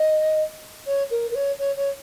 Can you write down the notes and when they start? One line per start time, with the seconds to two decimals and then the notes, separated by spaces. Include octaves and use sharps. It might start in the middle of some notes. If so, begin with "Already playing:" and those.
Already playing: D#5
0.86 C#5
1.10 A#4
1.31 A#4
1.35 C#5
1.59 C#5
1.77 C#5